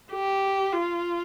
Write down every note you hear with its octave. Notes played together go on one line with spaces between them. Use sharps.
G4
F4